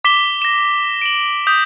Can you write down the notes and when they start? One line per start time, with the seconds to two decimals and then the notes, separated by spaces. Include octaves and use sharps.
0.05 D6 B6 E7 G7
0.42 A#6 E7
1.02 D7 F#7
1.47 D#6 G6 B6